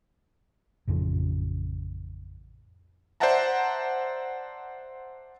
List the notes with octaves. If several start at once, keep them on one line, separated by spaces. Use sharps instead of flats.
A1 F2 C#3 F3
C5 D5 E5 F#5 A5 A#5